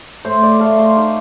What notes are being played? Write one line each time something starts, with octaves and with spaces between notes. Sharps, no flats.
A2 C5
D5
A3 F5
C6
D#4 D6